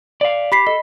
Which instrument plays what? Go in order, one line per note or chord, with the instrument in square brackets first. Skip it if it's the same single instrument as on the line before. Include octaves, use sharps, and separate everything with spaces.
[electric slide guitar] D5 F5
[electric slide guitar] G4 [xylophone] B5 B6 C7
[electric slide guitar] A4 [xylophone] D#5